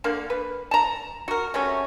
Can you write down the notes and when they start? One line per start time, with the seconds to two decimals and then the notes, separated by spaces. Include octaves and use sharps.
0.04 D3 A#3 F5
0.30 B4
0.71 A5 A#5
1.28 F#4 A#4
1.54 C3 F#3 A3 C#4